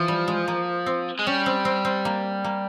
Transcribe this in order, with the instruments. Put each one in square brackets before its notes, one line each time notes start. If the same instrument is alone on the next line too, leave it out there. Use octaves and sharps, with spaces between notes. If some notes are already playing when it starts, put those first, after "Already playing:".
Already playing: [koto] E3 [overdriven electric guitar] F3
[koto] G3
G#3
A#3
C4
[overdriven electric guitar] G#3
[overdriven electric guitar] G3 [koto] C#4
[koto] C4
C4
C4
A#3
A#3